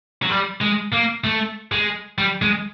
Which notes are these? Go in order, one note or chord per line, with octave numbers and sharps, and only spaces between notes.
F#3
G3
G#3
A#3
A3
G#3
G3
G#3